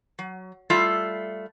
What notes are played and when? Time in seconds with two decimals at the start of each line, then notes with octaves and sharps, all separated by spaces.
0.19 F#3
0.70 G3 A3 F4 E5